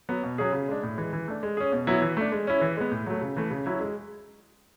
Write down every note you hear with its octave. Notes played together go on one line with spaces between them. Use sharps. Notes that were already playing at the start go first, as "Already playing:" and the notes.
F#3 B3
B2
F#3 C#4 G#4
C#3
G#3 D4
A2
E3 G#3
E3
A3 D4
G#3
C#4 G#4
B2
F#3 B3 E4
E3
A3 D4
G#3
C#4 E4
E3
G#3 B3
A2
F#3 A3
C#3
E3 A3
C#3
F#3 C#4 E4
G#3